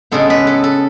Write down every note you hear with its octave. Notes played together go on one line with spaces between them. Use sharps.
C#3 G#3 B3 A4
B4
A4
A4